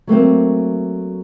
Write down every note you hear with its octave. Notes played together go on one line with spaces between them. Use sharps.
F#3 A3 A#3 C4